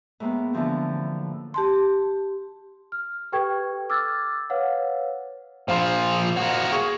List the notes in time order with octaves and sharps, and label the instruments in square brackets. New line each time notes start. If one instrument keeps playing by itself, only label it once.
[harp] A2 G#3 A#3 B3
D3 E3 F3 C4
[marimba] G4 A5 C6
[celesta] F6
G4 A4 B4 G5 C#6 G#6
D6 E6 F6 G#6 A6
B4 C#5 F5 F#5
[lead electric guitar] A#2 F3 [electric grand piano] C5 F5 C6
[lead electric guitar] A#3 F#4
[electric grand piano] G#4 C#6